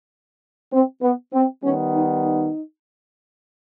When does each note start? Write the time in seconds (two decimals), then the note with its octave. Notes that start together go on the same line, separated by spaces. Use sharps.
0.73 C4
1.02 B3
1.33 C4
1.63 D#3 G3 B3 C#4
1.94 D#4
2.25 D#4